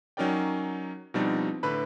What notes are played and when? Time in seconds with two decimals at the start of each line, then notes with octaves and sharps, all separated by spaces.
0.17 F#3 C#4 D#4 A#4 D5 G5
1.14 B2 F3 G3 C4 D4 D#4
1.63 A2 D3 B4 B5